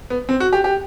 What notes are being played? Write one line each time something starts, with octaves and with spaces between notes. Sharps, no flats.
B3
C4
F#4
G4
G4